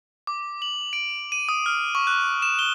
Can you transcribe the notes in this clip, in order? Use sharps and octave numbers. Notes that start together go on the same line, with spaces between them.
D6
F#7
D7
D#7
D#6
F6
C#6
F#6
E7
G7